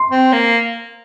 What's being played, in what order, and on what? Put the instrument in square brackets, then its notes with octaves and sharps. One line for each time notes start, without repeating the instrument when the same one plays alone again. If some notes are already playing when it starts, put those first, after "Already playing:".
Already playing: [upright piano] C6
[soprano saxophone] C4
A#3